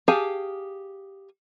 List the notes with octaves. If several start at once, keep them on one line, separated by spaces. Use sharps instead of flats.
G4 G#4 F5 G#5 A5